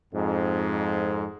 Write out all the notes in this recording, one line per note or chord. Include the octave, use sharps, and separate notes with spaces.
F2 G#2